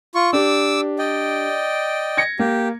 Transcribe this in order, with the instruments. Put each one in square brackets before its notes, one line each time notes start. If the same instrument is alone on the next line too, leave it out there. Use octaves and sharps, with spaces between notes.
[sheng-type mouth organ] F4 C#6
[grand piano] D4 G4 [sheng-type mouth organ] D6 E6
[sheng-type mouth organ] D5 D#5 G5
[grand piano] G#6 A#6 C#7
[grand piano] A#3 [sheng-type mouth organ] G4